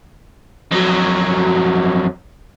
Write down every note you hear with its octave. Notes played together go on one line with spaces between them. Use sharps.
F2 F#3